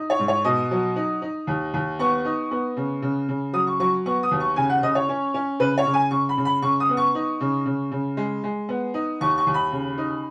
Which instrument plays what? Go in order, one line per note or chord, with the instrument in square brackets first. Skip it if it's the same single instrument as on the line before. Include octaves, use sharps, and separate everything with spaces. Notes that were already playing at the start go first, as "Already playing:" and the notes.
Already playing: [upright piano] D#4
C#5
G#2
C#5
B2 D#5
F#3
D#4
D#4
D#2
D#2
B3 C#6
D#4
B3
C#3
C#3
C#3
F#3 D#6
C#6
F#3 C#6
B3 C#6
D#6
D#2
C#6
C#3 G#5
F#5
C#3 D#5
C#5
C#4
C#4
C#3 B4
C#5
C#3
G#5
C#3 C#6
B5
C#3
B5
C#3 C#6
D#6
B3
C#6
D#4
C#3
C#3
C#3
G#3
G#3
B3
D#4
D#2 C#6
C#6
D#2
B5
C#3
D#4